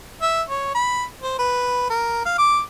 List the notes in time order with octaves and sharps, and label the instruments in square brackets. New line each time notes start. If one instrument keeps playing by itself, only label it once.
[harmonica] E5
C#5
B5
C5
B4
A#4
F5
D6